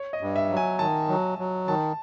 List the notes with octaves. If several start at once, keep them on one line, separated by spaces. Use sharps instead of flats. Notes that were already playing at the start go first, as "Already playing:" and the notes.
Already playing: C#5
D#5
G2
E5
F#3
G#5
D#3 A5
F#3
F#3
D#3 A5